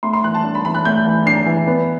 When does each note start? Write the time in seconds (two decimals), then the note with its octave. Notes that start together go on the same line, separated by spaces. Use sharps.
0.03 A3 C6
0.13 C6
0.24 E3 F#6
0.34 A5
0.44 D4
0.55 B5
0.65 E3 B5
0.75 F#6
0.85 A3 G6
1.06 E3
1.26 D4 C7
1.46 E3
1.67 B3